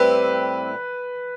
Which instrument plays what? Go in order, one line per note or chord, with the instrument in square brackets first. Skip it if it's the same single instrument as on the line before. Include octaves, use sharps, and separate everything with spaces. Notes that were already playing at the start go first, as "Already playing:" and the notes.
Already playing: [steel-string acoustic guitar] A2 G3 C4 E4 G4 [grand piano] B4